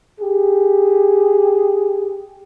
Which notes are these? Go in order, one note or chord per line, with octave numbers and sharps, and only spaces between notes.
G4 G#4